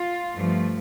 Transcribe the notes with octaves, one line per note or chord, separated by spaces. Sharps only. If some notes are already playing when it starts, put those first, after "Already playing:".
Already playing: F4
G2 F3 A3